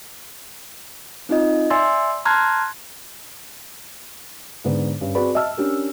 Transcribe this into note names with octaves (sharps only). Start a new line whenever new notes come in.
C4 D#4 F4 D#5
D5 E5 G#5 C6 E6 A6
A5 A#5 C6 F6 F#6 G#6
G#2 D3 B3 D5
G2 C#4
C4 F#4 G#4 B4 D5 B5
D#5 E5 A5 E6 F6
C#4 D4 G4 A#4